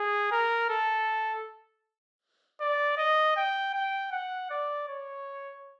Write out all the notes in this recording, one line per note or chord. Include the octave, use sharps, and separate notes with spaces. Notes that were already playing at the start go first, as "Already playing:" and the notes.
Already playing: G#4
A#4
A4
D5
D#5
G5
G5
F#5
D5
C#5